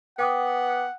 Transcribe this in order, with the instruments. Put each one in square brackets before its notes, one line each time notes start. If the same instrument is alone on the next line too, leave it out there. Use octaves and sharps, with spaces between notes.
[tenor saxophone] B3 [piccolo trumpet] F#5 [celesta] G5 D6 D#6